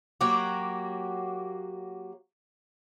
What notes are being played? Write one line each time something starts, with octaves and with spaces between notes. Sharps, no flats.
F#3 A#3 F#4 G4